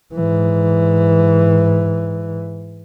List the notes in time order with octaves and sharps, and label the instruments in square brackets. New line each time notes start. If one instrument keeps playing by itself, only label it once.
[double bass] G#2 E3